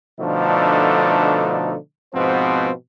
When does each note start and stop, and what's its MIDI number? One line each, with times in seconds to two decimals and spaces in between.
0.20 1.75 47
0.20 1.75 50
0.20 1.75 53
0.20 1.75 57
0.20 1.75 62
0.20 1.75 63
2.14 2.70 44
2.14 2.70 47
2.14 2.70 53
2.14 2.70 59
2.14 2.70 60
2.14 2.70 72